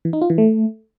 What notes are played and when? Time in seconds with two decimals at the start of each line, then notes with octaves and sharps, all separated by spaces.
0.05 E3
0.13 D#4
0.22 F4
0.30 E3
0.38 A3